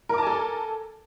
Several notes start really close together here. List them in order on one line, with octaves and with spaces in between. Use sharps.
A#4 D6 A5 G#5 A4